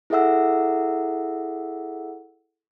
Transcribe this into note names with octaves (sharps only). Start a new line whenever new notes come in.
E4 G#4 A4 E5 F#5 E6